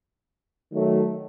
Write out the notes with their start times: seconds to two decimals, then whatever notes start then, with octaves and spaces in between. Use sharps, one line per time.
0.72 D#3 F#3 A3